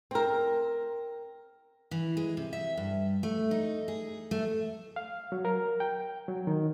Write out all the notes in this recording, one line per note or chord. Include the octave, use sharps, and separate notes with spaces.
C4 A#4
E3
G#3
C3
E5
G2
A3
D#4
G#4
A3
F5
F#3
A#4
G5
F#3
D#3